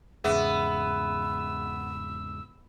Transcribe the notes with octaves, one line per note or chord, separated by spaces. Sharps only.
E2 G#2 C#3 B3 G#4 E5 E6